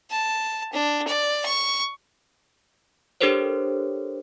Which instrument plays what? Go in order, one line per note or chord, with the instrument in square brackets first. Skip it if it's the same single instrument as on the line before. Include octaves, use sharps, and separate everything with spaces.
[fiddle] A5
D4
D5
C#6
[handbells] D4 G4 A4 A#4 C5 C#5